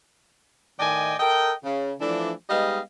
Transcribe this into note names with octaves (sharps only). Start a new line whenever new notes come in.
A2 D#3 D5 D#5 G5 G#5
A4 A#4 D#5 G5
C#3
E3 F3 A3 D4
G3 G#3 B3 D#4 D#5 F5